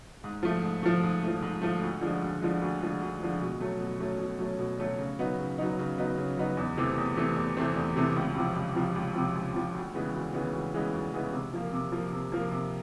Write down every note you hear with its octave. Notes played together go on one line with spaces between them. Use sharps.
G#2
F3 A3
G#2
F3 A3
G#2
F3 A3
G#2
F3 A3
D2
D3 F3 G#3
D2
D3 F3 G#3
D2
D3 F3 G#3
D2
D3 F3 G#3
B2
F#3 A3 C#4
B2
F#3 A3 C#4
B2
F#3 A3 C#4
B2
F#3 A3 C#4
C#3
F#3 B3 D#4
C#3
F#3 B3 D#4
C#3
F#3 B3 D#4
C#3
F#3 B3 D#4
E2
C3 E3 A3 C4
E2
C3 E3 A3 C4
E2
C3 E3 A3 C4
E2
C3 E3 A3 C4
C#2
C3 F3
C#2
C3 F3
C#2
C3 F3
C#2
C3 F3
D2
C#3 E3 G#3 B3
D2
C#3 E3 G#3 B3
D2
C#3 E3 G#3 B3
D2
C#3 E3 G#3 B3
C3
F3 A#3
C3
F3 A#3
C3
F3 A#3
C3